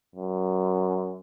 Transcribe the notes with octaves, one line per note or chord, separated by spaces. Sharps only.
F#2